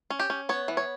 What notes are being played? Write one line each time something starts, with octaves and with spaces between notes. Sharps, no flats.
C#4
G4
C#4
B3 C#5
E3
C#5